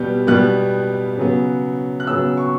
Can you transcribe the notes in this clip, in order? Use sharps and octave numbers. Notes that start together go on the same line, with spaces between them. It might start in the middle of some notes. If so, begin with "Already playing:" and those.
Already playing: B2 G3 B3 G6
B2 G3 B3 F#6
C#3 F#3 B3
F#6
C#3 F#3 B3 E6
C#6